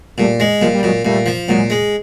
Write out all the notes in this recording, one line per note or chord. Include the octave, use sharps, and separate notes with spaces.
A#2 G3 A3
G#3
A#2 F3 G3
G3
A#2 F#3 G#3
A#2 G3 A3
F3
A#2 F#3 G#3
G#3